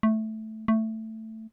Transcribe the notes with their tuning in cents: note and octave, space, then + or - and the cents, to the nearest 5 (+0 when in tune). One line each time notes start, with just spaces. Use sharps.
A3 -5
A3 +10